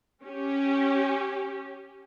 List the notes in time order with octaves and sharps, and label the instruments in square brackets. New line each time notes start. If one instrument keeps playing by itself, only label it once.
[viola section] C#4 G4